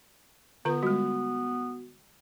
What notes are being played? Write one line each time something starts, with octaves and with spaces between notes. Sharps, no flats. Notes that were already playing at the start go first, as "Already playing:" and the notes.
D3 B3 F4 B4
G3 G#3 F#4